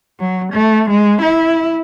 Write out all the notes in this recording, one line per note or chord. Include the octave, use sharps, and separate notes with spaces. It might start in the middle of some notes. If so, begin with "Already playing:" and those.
F#3
A3
G#3
E4